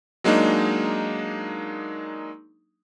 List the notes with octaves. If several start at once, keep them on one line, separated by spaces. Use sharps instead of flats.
F#3 G#3 A#3 D4 D#4